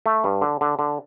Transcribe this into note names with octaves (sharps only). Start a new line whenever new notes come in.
A3
G2
D3
D3
D3